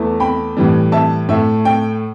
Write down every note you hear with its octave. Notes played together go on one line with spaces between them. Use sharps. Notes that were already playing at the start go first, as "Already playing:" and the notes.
Already playing: E2 E3 A3
G5 B5
A2 E3 G3
E5 A5
A2 A3 E5
G5